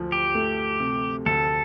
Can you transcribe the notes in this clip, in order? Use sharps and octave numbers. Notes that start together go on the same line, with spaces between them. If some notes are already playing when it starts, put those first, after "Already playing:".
Already playing: D2 F3
G4
A3
C3
D2 A4